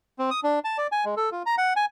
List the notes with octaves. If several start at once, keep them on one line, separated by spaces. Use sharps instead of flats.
C4
D#6
D4
A5
D5
G#5
G#3
A4
F4
A#5
F#5
G#5